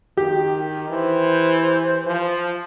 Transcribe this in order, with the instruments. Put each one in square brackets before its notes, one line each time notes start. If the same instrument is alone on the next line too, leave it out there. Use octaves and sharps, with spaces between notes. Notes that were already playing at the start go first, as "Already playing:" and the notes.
[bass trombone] D#3 [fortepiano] G4
[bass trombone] E3 [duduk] C5
[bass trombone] F3